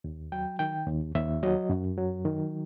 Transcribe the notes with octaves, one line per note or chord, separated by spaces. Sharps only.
D#2
F#3 G5
D#3 G5
D#2
D#2 E5
F#3 D#5
F#2
F#3
D#3